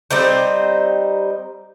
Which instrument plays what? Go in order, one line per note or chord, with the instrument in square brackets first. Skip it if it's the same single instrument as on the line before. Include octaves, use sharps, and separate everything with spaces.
[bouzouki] G3 C4 D#4 C5